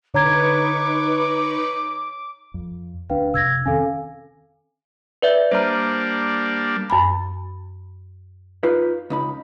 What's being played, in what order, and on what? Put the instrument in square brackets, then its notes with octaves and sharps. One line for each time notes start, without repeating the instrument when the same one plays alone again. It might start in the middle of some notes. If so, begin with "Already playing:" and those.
[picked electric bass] D3 [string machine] D#4 B4 C#6 [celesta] C#5 A#5 G#6 [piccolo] D6
[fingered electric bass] F2
[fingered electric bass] D2 D4 [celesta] B4 F5 G5
[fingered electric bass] F2 C3 [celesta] E6 G#6 A#6
[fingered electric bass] D#3 C4 C#4 [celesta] A4 F5 G#5
[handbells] B4 D5 E5
[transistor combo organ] G3 A#3 D4 [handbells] C5 A#5
[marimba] F#2 G#5 B5
[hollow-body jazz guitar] D#4 F4 B4
C#2 D#4 B5